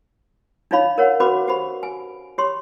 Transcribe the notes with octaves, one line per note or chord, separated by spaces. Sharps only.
D4 D#4 F4 C#5 F5 B5
A#4 C#5 F#5
C#4 F#4 B4 B5 D6
G4 C5 B5
G#5
G4 C#5 B5 C6